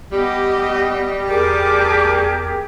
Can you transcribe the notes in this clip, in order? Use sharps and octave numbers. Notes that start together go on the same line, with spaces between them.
G3 B3 G4 D#5
E2 G4 G#4 A#4 A5 D6